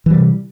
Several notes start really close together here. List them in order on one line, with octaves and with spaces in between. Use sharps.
E3 G3 C3